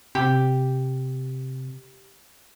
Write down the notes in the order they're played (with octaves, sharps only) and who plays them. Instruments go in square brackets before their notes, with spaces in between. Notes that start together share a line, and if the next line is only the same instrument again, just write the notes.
[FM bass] C3 [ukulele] G4